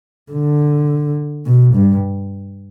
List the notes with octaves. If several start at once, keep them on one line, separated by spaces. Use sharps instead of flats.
D3
B2
G2